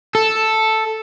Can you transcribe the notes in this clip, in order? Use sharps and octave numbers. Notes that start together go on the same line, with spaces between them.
A4